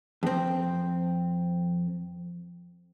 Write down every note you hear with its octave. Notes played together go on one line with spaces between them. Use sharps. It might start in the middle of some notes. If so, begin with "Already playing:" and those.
F2 C4